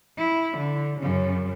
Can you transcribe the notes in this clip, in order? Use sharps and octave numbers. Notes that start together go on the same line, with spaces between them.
E4
D3
F#2 C#3